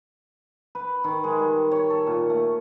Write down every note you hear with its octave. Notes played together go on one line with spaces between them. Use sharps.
B4
D#3
G#3
G3
C#5
A4
A#2
A3